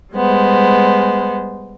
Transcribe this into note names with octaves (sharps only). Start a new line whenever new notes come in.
G3 G#3 B3 C5